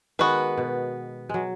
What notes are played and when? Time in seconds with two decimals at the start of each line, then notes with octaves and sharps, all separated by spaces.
0.19 D#3 G#3 B3 F#4 B4
0.58 B2
1.29 F#3 G#3